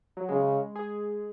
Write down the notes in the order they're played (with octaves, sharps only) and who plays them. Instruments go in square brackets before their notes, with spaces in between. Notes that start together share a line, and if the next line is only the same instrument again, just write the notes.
[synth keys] F#3
[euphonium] C#3 [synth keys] G#3
[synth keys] G#4